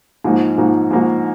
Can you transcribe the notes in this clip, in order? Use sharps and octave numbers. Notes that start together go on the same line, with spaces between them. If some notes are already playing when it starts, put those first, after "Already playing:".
G#2 F3 A#3 D#4 F#4
G#2 F3 A#3 D#4 F#4
G#2 F3 A#3 D#4 F#4